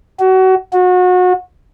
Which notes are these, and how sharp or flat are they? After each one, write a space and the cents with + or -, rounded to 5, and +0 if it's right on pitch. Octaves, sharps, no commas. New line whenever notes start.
F#4 +25
F#4 -30